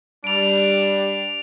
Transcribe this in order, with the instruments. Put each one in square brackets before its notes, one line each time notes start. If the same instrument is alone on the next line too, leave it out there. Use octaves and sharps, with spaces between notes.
[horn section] G3 [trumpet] D4 [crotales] D7 F7